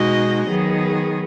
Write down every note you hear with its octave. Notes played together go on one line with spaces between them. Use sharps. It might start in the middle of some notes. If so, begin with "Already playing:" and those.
Already playing: B2 G#3 D#4 F#4 D#5
D#3 F#3 B3 G#4